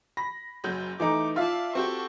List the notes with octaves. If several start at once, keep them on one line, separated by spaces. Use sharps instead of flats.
B5 A#6
F#1 F#3 G6
E3 A3 D#4 D6
F4 D5 E5 F5 A5
C4 F#4 G4 A4 C#6